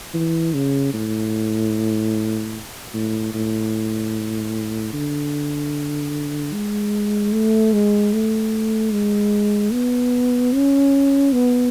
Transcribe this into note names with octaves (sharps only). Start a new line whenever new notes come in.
E3
C#3
A2
A2
A2
D3
G#3
A3
G#3
A3
G#3
B3
C#4
B3